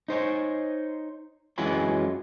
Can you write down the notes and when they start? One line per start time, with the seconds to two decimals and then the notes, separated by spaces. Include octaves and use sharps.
0.08 D#4 C5 C#5
1.58 F#2 E3 F#3 G#3 F4 B5